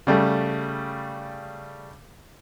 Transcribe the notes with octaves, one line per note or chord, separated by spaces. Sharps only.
C#3 G3 A3